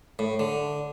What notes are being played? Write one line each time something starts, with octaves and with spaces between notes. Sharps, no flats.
A2
D3